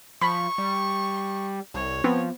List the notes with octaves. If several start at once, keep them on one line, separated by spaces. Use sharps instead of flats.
F3 B5 C#6
G3
C2 C#5
F3 B3 C4